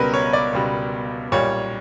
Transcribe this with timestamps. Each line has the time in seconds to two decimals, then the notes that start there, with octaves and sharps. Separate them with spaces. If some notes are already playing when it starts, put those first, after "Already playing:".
Already playing: C#2 B2 G3 A#4 B4
0.14 C#5
0.33 D5
0.53 C#2 B2 G3
1.32 B1 A#2 G3 C#5